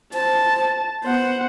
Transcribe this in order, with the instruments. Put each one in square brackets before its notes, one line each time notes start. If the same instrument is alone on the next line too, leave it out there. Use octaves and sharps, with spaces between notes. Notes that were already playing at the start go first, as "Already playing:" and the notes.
[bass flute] C5 [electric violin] A5
[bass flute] B3 [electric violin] C5 F#5